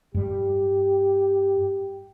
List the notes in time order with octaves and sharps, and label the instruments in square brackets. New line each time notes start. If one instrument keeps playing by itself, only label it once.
[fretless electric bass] G2 G3 [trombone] G4